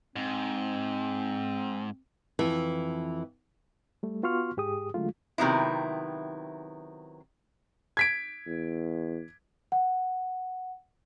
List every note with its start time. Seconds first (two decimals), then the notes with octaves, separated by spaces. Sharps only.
0.16 G#2 C4
2.39 F2 E3
4.03 G3 A3
4.23 B3 F4 F#4 C6 C#6 F6
4.57 G#2 G4 G#4 D#6
4.94 D3 F#3 G#3 A3 F4
5.38 C3 D#3 F#3 B3 E4
7.97 G#6 B6 D7
8.47 E2
9.72 F#5